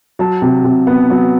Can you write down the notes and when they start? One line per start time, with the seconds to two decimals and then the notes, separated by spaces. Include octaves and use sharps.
0.19 F#3 A5
0.42 C3
0.64 C3
0.87 B3
1.10 F#3